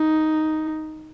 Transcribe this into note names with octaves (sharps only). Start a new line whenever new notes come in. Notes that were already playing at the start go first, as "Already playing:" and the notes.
Already playing: D#4